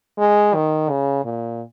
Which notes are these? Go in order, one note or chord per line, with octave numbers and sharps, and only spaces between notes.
G#3
D#3
C#3
A#2